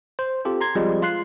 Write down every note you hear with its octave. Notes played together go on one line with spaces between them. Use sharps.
C5
C4 F4 G4 A4
A#5 C6 G#6
F3 G3 G#3 C4 F4
F4 C6 F#6 C7